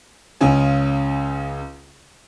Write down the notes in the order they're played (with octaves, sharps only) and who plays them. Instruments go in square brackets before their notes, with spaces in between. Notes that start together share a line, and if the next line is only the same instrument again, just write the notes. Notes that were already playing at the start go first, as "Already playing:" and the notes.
[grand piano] C#2 C#3 C#4 G#5